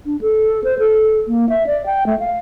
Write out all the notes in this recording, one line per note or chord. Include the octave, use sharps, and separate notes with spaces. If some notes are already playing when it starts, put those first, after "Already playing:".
D4
A4
C5
A4
A#3
E5
D5
G5
A3
F5